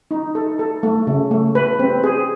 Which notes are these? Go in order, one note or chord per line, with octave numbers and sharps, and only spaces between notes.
D#4
A4
A4
A3
C#3
A3
B4
C4
G#4